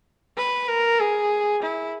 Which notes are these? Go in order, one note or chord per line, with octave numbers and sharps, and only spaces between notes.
B4
A#4
G#4
E4